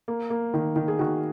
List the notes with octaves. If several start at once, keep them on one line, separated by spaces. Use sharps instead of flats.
A#3
A#3
D#3
D#3
G#4
D#3 F#4